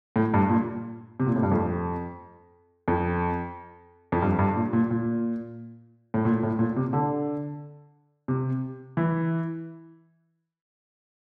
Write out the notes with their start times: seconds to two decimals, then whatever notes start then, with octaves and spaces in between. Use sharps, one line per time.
0.16 A2
0.34 G2
0.49 A#2
1.20 C3
1.27 A#2
1.36 A2
1.43 G2
1.51 F2
2.88 F2
4.12 F2
4.22 G2
4.39 G2
4.56 A#2
4.73 A#2
4.91 A#2
6.14 A2
6.25 A#2
6.43 A2
6.59 A#2
6.77 C3
6.93 D3
8.28 C3
8.97 E3